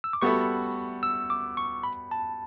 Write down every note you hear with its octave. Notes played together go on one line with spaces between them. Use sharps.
E6
D6
G3 B3 F#4 A4 E5 C#6
E6
D6
C#6
B5
A5